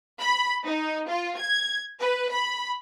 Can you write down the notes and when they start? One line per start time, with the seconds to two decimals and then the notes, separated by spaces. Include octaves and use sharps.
0.22 B5
0.65 D#4
1.07 F4
1.37 G#6
2.00 B4
2.32 B5